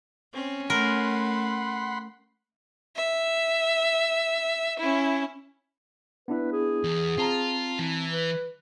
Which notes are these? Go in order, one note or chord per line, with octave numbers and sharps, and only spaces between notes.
C4 C#4
A3 A#4 F#5 B5 C6
E5
C#4 E4
B3 D4 E4 B4
G#4
E2
C4 F4 A5 A#5
E3
B4